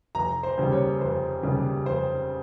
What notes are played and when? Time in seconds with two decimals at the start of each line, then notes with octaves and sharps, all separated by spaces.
0.15 F1 A#5
0.43 C5
0.58 D#2 C#3 G3
0.72 C#5
1.00 F1 C5
1.43 D#2 C#3 G3
1.86 F1 C5